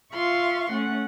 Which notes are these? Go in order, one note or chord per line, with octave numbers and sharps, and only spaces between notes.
F4 E5 F5 C6 C#6
A3 C#4 F#5